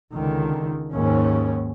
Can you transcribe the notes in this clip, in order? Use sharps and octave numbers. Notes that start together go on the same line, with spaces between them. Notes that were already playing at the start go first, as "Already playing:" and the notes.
C#2 D3 D#3
D#2 G#2 C#4